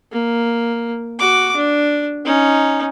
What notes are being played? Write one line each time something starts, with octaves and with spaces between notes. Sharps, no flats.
A#3
F#4 D6
D4
C#4 D#4